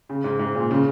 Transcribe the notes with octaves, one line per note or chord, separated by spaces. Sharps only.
C#3
G#2
G#2
A#2
C#3